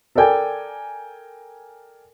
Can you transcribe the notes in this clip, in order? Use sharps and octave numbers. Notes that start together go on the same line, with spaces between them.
A4 A#4 D5 G5 G#5